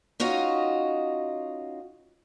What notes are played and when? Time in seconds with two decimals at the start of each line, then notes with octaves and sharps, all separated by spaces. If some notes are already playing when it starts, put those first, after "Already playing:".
0.20 C#4 D#4 F4 F#4 D#5